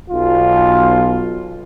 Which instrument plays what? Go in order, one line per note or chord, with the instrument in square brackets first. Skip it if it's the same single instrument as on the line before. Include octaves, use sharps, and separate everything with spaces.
[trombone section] B1 F4